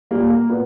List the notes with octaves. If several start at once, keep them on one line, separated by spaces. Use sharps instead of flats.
A#2 G3 A#3
A#3
A#2 B3